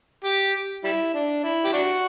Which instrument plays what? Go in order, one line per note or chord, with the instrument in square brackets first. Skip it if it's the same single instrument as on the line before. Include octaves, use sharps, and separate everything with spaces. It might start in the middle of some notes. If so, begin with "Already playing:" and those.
[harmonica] G4
G3 E4
D4
E4
G4
D4 F#4